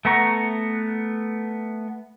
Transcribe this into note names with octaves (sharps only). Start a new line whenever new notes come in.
A3 B3 F#5 A#5 C#6